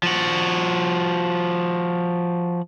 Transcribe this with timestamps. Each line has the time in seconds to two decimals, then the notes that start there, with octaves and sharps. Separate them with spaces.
0.03 F3 F#4